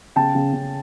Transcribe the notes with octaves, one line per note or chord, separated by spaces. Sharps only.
C#3 G5 A5
C#3
C#3